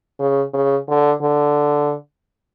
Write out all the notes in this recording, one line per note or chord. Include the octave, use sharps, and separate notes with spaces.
C#3
C#3
D3
D3